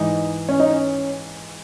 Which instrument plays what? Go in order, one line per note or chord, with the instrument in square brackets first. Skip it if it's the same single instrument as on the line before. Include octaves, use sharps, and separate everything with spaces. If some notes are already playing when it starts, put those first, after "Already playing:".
Already playing: [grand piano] G#2 E3 D#4
C#4
D#4
C#4